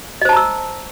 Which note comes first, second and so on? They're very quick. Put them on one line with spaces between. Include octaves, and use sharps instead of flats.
D#5 C5 A5 A#5 E6